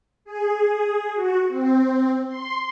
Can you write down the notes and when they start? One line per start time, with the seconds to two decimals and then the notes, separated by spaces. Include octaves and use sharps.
0.25 G#4
1.14 F#4
1.48 C4
2.27 C6